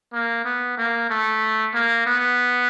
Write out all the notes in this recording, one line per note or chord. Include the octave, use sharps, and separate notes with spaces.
A#3
B3
A#3
A3
A#3
B3